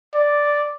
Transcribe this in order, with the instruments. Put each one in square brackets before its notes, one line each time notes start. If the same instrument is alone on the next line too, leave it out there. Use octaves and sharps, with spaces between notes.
[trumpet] D5